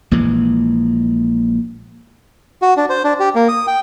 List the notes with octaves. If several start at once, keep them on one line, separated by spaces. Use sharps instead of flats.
A#1 A#2 E3 G#3
F#4
D4
C5
D4
G4
A#3
D#6
G5